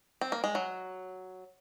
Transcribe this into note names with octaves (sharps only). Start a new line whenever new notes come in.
C4
A#3
G#3
F#3